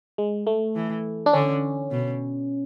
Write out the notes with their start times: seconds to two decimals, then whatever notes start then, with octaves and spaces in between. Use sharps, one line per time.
0.18 G#3
0.47 A3
0.75 E3
1.26 D4
1.33 D3 C#4
1.91 B2